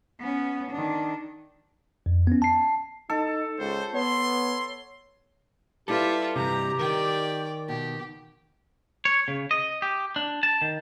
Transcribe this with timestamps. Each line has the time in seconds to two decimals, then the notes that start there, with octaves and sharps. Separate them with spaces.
0.20 B3 C#4
0.71 D#3 D4
2.06 F2
2.27 B3 C#4
2.42 A5 C7
3.10 D#4 A4
3.59 C#2 C5
3.94 B3 C#5 C6
5.88 G3 E4 F4 G4 A4 B4 E5
6.36 G2 C3 G4 A#5
6.79 D#3 A#4 D5 G5
7.68 B2 G4
9.05 C#5
9.28 C#3
9.51 D#5
9.82 G4
10.16 D4
10.43 A5
10.62 D#3